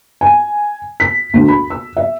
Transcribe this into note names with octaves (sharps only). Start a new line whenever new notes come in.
G#5
B6
D2
B5
E6
E5